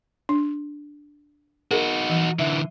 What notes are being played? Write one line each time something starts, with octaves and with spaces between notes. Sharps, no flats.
D4
D#4 F#4 G#4 A#4
E3
D3 E3 E5